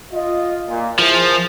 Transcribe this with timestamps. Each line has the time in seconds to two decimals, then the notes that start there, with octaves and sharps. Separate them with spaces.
0.13 F4 D#5
0.69 A#2
0.99 F3 E4 G#4 A#4